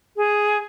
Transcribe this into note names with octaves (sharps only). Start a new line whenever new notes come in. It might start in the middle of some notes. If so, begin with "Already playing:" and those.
G#4